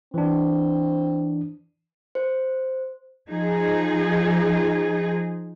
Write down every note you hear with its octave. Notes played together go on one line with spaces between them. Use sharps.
E3 C4 D4
C5
F3 D#4 G#4